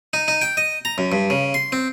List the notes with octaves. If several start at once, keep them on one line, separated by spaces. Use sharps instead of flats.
D#4
D#4
G5
D#5
A#5
F#2
G2
C#3
C6
C4